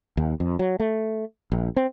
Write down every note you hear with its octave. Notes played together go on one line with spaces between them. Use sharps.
D#2
F2
F#3
A3
A#1
C4